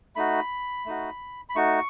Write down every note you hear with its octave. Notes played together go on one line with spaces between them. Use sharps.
A3 D#4 F#4 B5
A3 D#4 F#4
B5
A3 D#4 F#4 C#6